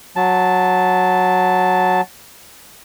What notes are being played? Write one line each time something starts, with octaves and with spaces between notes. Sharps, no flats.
F#3 A5